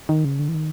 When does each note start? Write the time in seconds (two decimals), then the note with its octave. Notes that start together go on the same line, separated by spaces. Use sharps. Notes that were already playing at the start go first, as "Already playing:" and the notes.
0.09 D#3
0.25 C#3
0.39 D3
0.49 E3
0.54 D#3